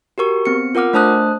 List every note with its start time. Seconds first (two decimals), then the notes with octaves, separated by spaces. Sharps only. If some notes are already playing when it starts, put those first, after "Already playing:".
0.18 F#4 G4 A#4 C#6
0.45 B3 C4 C#7
0.75 F4 A#4 F#5 D6 F6
0.93 A3 D4 C5 A5 D#6 F#6